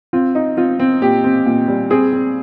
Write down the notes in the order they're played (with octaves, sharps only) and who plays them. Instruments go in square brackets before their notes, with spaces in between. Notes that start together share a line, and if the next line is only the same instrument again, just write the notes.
[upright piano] C4 F4
D#4
C4 F4
C4
A#2 G4
C4
A#2
G3
C4 G#4
C4